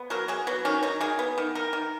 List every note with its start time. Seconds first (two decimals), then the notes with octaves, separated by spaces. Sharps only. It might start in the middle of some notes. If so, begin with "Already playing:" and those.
Already playing: B3
0.10 F#3 A#4
0.28 F#3 G#4
0.47 F#3 B3
0.65 D#3 C#4
0.83 F#3 D#4
1.01 D#3 G#4
1.19 B3
1.38 D#3
1.55 D#3 A#4
1.73 D#3